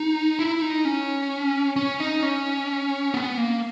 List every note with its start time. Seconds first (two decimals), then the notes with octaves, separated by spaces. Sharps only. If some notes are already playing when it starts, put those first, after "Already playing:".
Already playing: D#4
0.39 E4
0.62 D#4
0.85 C#4
1.76 C#4
2.00 D#4
2.23 C#4
3.14 B3
3.37 A#3